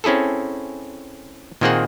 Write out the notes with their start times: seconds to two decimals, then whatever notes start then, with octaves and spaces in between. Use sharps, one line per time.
0.04 C4 C#4 E4 G#4 A4
1.61 A#2 D#3 A#3 C4 G#4 F#5